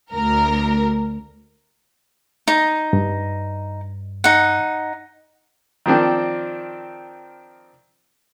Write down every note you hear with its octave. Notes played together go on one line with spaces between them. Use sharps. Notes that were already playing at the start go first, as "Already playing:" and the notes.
D2 A#4
D#4
G2
D#4 F#5
D#3 F3 C4 D4